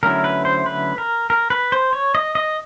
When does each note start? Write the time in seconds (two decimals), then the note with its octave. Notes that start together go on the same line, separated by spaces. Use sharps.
0.03 D3 F#3 A3 C#4 E4 A#4
0.24 B4
0.45 C5
0.66 B4
0.98 A#4
1.30 A#4
1.50 B4
1.72 C5
1.93 C#5
2.15 D#5
2.35 D#5